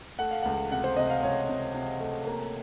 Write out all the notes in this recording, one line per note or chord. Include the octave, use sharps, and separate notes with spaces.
A3 F#5
F5
C#2 F#5
C3 F#5
C5
C3 D#5
F5
C#2 C#5
C3
C3
A3
A#3